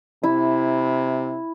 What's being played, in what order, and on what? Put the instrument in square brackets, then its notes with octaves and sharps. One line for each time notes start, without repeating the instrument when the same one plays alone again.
[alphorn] C3 [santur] E4